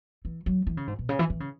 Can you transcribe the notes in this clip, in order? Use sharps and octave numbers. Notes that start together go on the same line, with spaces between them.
E3
F#3
E3
C#3
G#2
B2
C#3
E3
E3
C#3